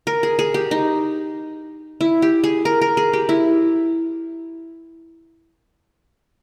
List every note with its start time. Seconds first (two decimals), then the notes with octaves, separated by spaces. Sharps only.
0.07 A#4
0.23 G#4
0.39 G#4
0.54 G4
0.71 D#4
2.01 E4
2.22 G4
2.44 G#4
2.65 A#4
2.81 A#4
2.97 G#4
3.13 G4
3.29 E4